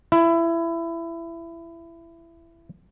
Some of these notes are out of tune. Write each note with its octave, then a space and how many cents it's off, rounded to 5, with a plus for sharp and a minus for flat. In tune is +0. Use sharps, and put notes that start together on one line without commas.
E4 +20